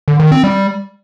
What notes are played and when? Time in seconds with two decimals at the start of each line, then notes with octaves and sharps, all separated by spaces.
0.08 D3
0.20 D#3
0.32 C4
0.44 G3